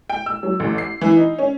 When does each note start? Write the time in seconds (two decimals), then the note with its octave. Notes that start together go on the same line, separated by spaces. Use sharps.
0.10 G5
0.26 E6
0.43 F#3
0.60 A1
0.78 C7
1.01 E3
1.17 D#4
1.39 C#4